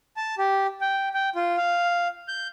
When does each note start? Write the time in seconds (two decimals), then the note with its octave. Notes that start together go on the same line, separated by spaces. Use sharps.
0.17 A5
0.38 G4
0.81 G5
1.14 G5
1.35 F4
1.57 F5
2.28 G6